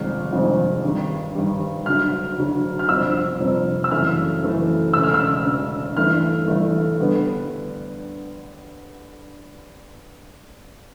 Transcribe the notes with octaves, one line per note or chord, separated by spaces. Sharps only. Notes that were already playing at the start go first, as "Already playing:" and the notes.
Already playing: G1 F2 C3 D#3 G#3 F6
G1 F2 C3 D#3 G#3
G2 D#3 G3
G2 D#3 G3
D2 D3 F#3 F6
D2 D3 F#3
F6
G1 F2 C3 E6
G1 F2 C3
E6
F#2 C#3 E3 A3 F6
F#2 C#3 E3 A3
E1 D2 C#3 E6
F6
E6
E1 D2 C#3
G1 G2 E3 A3 F6
G1 G2 E3 A3
D3 G3 B3